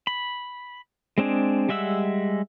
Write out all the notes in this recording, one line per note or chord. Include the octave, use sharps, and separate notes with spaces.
B5
G#3 C4 D4 G#4
G3 G#3 E5 F#5 E6